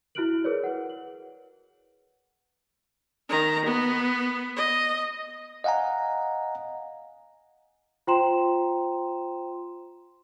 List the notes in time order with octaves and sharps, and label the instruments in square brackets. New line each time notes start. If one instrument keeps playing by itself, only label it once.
[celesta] E4 F#4 F6 F#6 D7 F#7
G#4 A#4 B4 C#5 D5
B4 F#5
F#7
[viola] D#3 A#5
B3
D#5
[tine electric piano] D#5 F5 F#5 G#5 A#5
[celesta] F4 C5 G5 A#5 C6 E7